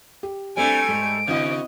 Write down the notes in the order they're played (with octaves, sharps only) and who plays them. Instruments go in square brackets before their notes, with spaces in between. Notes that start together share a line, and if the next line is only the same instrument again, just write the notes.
[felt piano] G4
[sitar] G3 A3 [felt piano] C4 D4 [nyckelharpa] G#5 [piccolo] D7
[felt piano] G#2 G#3
[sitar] C#3 F#4 [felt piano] C4 E4 [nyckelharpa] D#5